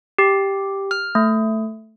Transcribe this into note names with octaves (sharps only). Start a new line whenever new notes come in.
G4
F6
A3